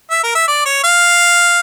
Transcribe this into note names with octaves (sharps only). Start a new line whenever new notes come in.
E5
A#4
E5
D5
C#5
F5